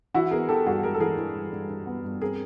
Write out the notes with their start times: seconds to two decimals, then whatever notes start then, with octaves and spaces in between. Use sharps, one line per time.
0.14 E3 E4 F#4
0.31 B3 G#4 A#4
0.49 E3 G4 A4
0.66 G2 F#4 G#4
0.83 G#3 G#4 A#4
0.94 A4
1.00 E3 G#4 A#4
1.17 E3
1.35 G2
1.52 G2
1.69 G2
1.86 B3
2.04 G2
2.21 C4 G#4 A#4